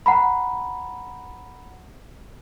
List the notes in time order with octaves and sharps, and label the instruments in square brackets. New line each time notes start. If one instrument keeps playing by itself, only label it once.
[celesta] F#5 A#5 B5